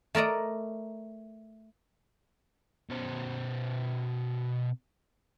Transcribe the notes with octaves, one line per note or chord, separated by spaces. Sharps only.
A3 A#4 D5 D#5
B2 C5